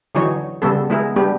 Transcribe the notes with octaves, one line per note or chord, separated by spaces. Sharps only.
D3 E3 F#3 D#4 C#5
C#3 G3 B3 A4
G#3 B3 E4 G#4 A#4
G3 B3 D4 G4